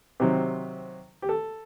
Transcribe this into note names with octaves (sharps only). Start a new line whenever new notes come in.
C3 D#3 F#3 C4 G4
G4
A4